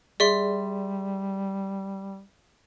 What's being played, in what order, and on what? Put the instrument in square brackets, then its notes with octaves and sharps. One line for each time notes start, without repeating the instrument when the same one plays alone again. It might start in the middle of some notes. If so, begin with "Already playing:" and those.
[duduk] G3 [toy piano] G#4 [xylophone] D5 E5 C6